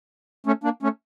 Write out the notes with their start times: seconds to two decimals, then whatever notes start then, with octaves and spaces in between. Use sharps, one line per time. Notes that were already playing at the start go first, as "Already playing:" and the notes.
0.46 A3 C#4
0.64 A#3 D4
0.83 A3 C#4